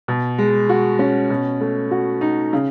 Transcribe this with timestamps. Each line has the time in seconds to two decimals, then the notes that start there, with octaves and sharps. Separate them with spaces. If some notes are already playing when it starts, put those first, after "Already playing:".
0.08 B2
0.38 G#3
0.69 F#4
0.99 C#4
1.30 B2
1.61 A3
1.91 F#4
2.21 D#4
2.53 C#3